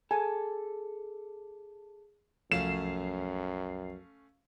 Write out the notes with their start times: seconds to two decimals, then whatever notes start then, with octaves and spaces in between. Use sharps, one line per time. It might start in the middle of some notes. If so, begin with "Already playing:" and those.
0.11 G#4 A4 G#5
2.52 C2 F#2 F3 A3 C#4 F5 C7 E7